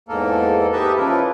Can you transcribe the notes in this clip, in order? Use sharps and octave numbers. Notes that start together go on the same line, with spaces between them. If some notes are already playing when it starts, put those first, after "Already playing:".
E2 G#2 A#3 A4 A#4
G4 A4 B4 D#5 E5 A5
C#3 F3 E4 A#4 B4